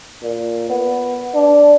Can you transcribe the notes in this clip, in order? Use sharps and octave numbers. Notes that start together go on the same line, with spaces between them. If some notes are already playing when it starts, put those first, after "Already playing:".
A#2
B3
D4